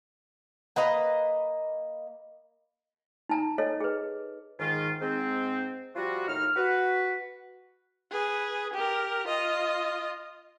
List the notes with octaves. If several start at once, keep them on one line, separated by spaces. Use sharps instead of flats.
A#3 B4 D#5 A#5
D#4 A5 A#5
A4 C#5 D#5
G#4 B4
G#2 D#3 F4
G#2 C4
F3 G3 F4 F#4
D#2 A2 D#4 F6
F#4 B4
G#4 B4
G4 A#4
F4 D#5